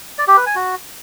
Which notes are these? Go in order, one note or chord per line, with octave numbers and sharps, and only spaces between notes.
D5
G4
B4
G#5
F#4